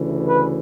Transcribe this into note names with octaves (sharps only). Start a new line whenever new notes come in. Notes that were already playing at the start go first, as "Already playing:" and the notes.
Already playing: D2 C#3 E3
B4